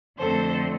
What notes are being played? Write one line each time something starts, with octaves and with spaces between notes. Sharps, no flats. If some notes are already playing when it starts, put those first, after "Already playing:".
F2 D3 A3 C4 A4 C5